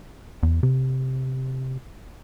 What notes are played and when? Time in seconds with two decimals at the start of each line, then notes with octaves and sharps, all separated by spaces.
0.43 E2
0.63 C3